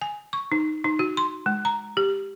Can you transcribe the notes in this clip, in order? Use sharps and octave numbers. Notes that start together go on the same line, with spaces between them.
G#5
C#6
D#4
D#4
F#4
C6
G#3
A#5
G4